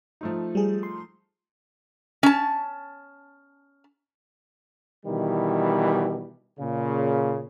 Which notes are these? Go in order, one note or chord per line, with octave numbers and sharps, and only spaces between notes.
F3 A3 D#4
G3 G#4
C6
C#4 A5
B2 D#3 E3 G3
A#2 C#3